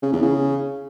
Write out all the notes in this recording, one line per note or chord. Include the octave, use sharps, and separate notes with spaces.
C#3
E2
C#3